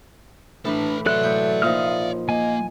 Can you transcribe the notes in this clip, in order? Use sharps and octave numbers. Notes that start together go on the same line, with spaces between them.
A2 E3 D4 A4 B4
F#3 A4 D5 E5 C6 F#6
A2 G6
A#2 F3 D#4 F5 D#6 F6
A#3 D#5 G#5